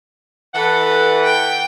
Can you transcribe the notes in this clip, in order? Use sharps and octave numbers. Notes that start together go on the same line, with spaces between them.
E3 A4 F#5
G5